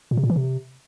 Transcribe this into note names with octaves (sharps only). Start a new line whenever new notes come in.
A#2
C3
A#2
E3
C3